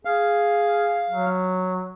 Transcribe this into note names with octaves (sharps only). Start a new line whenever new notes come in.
G#4 F5
F#3